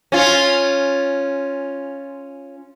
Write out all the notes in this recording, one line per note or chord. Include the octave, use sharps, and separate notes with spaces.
C#4 F4